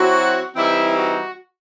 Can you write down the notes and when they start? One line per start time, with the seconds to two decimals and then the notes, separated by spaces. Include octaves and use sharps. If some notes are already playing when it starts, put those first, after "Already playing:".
Already playing: F#3 C4 E4 F#4
0.55 E3 G3 C4 D#4 E4
0.96 F#4